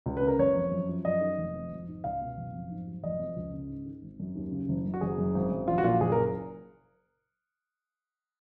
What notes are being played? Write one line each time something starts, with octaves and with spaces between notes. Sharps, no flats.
C#2
B4
C#3
A#4
F#1 C#5
F2
F#2
F3
F#2 D#5
D#3
F1
F2
G#1
G#2
C#2 F5
B2
F#1
F2
G#2
F#3
F1 D#5
F2
C#2
C#3
G#2
D#3
G#1
F#2
D#2
C#3
F#1
F#2
F#4
F#1 G#4
F#2
G#1
F#2
A#1 F4
F#4
A#2 F4
F#1 G#4
A#4